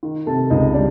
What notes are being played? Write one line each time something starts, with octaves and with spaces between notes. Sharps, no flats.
D#3
C3 A4 A5
C#2 D#4 D#5
G3 D4 D5